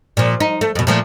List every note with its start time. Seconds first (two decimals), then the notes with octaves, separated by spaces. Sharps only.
0.17 A#2 F3
0.40 D#4
0.61 A3
0.75 F2 B2
0.87 A#2 F3 A3